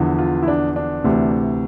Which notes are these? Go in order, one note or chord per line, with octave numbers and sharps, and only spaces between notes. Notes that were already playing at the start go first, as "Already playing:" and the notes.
Already playing: E2 D3 F3
F4
E4
D4
D4
D2 C3 E3